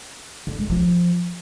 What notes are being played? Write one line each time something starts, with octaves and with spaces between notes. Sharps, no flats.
D3
G#3
F3